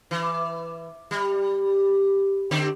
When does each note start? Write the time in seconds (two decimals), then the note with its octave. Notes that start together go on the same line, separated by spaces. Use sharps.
0.11 E3
1.11 G3
2.51 D3 C4 G4